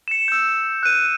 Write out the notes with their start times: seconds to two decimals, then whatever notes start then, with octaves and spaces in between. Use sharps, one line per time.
0.08 C#7 E7
0.28 E6 G6
0.83 F#6 D#7